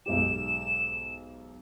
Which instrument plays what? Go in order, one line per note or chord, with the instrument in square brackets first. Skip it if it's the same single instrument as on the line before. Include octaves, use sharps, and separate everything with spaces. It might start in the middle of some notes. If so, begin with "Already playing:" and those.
[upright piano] B1 G#2 G4 [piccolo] E7